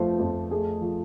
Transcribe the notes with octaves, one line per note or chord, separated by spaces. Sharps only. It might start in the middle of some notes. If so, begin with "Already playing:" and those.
Already playing: F2 F3 A3 C5
F2 C5
A3 G#4
F3